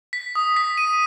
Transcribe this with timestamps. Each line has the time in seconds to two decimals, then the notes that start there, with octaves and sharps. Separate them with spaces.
0.13 B6
0.35 D#6
0.56 B6
0.78 D#7